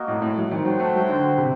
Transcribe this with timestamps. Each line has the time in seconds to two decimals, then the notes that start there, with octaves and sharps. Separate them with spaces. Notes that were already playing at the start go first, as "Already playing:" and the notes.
Already playing: A#3 F#4 A#4 D#5
0.08 A2
0.22 A2
0.37 F#3
0.51 D#3 F#4 C5 G5
0.65 F#3
0.80 A3
0.95 F#3
1.09 D3
1.38 C3